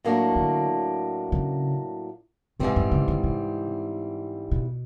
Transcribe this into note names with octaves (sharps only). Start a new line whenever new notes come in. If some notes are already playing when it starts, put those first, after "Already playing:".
A2 F#3 A#3 D4
D3
C#3
G#2 C3 E3 G3 C4
G2
C#3
D3
C3
B2